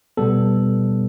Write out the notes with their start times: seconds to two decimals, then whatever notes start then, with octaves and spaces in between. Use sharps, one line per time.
0.17 B2 G3 B3 A4